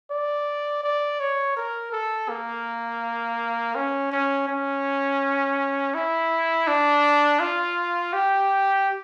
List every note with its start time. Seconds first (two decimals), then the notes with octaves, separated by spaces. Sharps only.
0.11 D5
0.84 D5
1.20 C#5
1.57 A#4
1.92 A4
2.29 A#3
3.75 C#4
4.12 C#4
4.48 C#4
5.94 E4
6.67 D4
7.40 F4
8.13 G4